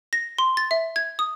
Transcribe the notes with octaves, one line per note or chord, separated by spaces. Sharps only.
A#6
C6
A6
E5
G#6
D#6